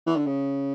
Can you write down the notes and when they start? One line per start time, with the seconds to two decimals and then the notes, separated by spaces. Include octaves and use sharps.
0.07 E3
0.16 D3
0.26 C#3